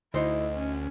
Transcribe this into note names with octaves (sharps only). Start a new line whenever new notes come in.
D2 D#4 E4 C5 D#5
C#4